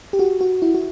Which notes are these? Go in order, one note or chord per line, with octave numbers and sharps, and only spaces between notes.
G4
F#4
F#4
E4
F#4